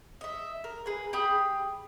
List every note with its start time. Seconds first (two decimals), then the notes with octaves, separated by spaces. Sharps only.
0.21 D#5 E5
0.64 A#4
0.86 G#4 B4
1.13 G4 G#4 B5 D#6